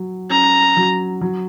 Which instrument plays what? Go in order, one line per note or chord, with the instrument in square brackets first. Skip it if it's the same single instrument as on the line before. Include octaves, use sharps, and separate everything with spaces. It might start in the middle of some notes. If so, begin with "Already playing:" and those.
Already playing: [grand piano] F#3
[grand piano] C#4 [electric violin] A#5
[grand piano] F#3
F#3